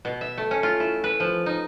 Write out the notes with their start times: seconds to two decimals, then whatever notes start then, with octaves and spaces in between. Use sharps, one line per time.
0.05 B2
0.21 E5
0.38 A3
0.51 C#4
0.63 F4
0.80 E4
1.04 B4
1.20 F3
1.46 D#4